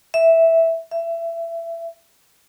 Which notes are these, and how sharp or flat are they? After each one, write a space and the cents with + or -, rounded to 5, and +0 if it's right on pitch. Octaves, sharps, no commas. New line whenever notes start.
E5 -5
E5 +25